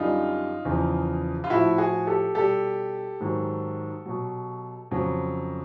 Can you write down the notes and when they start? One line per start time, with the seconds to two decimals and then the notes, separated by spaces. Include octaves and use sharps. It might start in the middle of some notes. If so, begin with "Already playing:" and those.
Already playing: F#2 D3 G3 D#4 F4
0.65 E2 C#3 F3
1.44 F4
1.50 A2 F3 E4 F#4
1.78 F#4 G#4
2.07 G4 A4
2.35 B2 G3 G4 A4
3.20 G#2 D#3 F#3
4.06 B2 F#3
4.91 F2 C#3 F#3